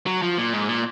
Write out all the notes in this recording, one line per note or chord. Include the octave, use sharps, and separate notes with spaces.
F#3
F3
A#2
G#2
A#2